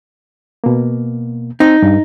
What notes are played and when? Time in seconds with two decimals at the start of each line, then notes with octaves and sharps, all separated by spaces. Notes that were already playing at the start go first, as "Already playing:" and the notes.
0.64 B2 A#3
1.60 C4 D#4
1.82 G2